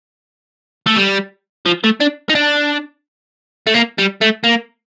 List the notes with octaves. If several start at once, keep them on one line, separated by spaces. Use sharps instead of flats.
A3
G3
F3
A3
D4
D#4
D4
A3
A#3
G3
A3
A#3